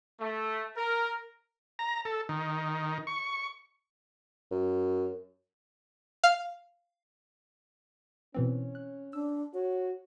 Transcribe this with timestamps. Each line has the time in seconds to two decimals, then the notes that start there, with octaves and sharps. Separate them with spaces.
0.21 A3
0.75 A#4
1.79 A#5
2.05 A4
2.29 D#3
3.07 C#6
4.51 F#2
6.24 F5
8.35 B2 E3 C4 C#4
8.75 F#6
9.13 D4 E6
9.54 F#4 C#5